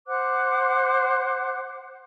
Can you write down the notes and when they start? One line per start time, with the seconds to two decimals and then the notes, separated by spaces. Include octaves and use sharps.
0.07 C5 F#5 D6 F#6